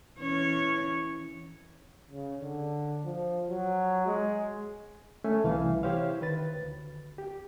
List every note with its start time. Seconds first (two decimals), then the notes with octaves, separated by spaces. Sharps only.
0.19 E3 C#4 C#5
2.11 C#3
2.40 D3
3.06 F3
3.50 F#3
4.06 G#3
5.24 A3 C#4 G#5
5.44 C2 E3 F5
5.83 E4 G4 C5 C#5 F5
6.22 D#3 B4 A6
6.55 D2
7.18 G4